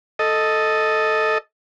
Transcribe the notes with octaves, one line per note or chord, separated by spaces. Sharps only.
A4 D#5